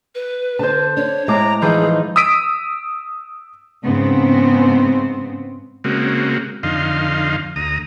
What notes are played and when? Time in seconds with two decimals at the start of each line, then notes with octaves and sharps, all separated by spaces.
0.15 B4
0.59 D3 C5 A5
0.97 D4 C#5
1.28 A2 G#3 A#5 D6
1.62 E3 F3 D#4 G#4 G6
2.16 D#6 E6 B6 D7 D#7
3.83 G#2 C#3 B3 C4
5.84 C#3 G#3 A#3 C4 F#4
6.63 F2 D3 D#4 F5 C6
7.56 D2 A#5 D#6